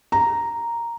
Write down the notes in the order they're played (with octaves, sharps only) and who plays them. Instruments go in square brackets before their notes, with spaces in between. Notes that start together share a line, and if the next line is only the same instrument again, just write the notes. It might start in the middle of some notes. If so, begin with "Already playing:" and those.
[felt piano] A#5